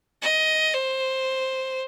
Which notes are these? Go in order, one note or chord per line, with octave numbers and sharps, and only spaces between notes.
D#5
C5